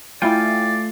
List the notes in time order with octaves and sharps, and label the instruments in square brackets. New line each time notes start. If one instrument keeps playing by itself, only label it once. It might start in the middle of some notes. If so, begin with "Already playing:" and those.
[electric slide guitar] A3 F5 G#5 [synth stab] E4 G5 [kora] F4 [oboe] D5